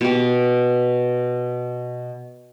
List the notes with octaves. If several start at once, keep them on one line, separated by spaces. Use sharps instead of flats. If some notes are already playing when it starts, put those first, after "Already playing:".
B2 G4